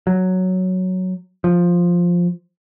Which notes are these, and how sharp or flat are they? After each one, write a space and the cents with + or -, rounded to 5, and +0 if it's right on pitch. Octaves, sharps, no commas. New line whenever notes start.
F#3 +0
F3 +5